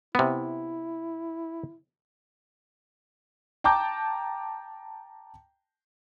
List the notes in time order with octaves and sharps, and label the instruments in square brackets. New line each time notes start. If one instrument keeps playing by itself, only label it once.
[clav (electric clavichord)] C3 B3 [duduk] E4
[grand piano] G5 A5 A#5 D6 G6